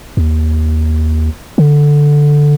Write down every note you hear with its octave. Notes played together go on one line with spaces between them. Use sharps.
D#2
D3